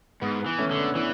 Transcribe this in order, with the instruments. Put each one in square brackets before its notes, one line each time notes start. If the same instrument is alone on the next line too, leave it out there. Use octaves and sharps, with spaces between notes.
[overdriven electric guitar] G#2 [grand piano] B3
[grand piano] B3
[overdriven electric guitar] E3
[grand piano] A3 C#4
[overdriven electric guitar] D3
[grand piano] B3 D4
[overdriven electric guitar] E3 [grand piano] B3 D4